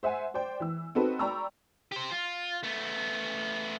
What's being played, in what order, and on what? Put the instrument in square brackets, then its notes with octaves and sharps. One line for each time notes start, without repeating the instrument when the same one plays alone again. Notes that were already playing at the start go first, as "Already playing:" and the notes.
[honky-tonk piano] C5 E5 F#5 G#5
C5 D5 G5
E3 E6
C4 D#4 F#4 A4 B4
D5 G5 A#5 B5 C#6 E6
[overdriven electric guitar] G4 C5
F4
A3 B3